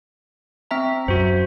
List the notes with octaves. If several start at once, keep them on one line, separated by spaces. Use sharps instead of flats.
C4 E5 A#5
F#2 F#4 C5